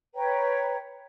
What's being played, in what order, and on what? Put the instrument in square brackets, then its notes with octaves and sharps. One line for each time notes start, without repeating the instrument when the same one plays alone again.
[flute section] B4 C#5 G5 A#5